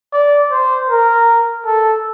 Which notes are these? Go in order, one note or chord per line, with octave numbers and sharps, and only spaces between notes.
D5
C5
A#4
A4